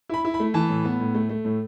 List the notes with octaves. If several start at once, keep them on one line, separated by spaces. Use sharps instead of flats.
E4 B5
E4
B5
A3
E3 A5
A2
B3
A2
A3
A3
A2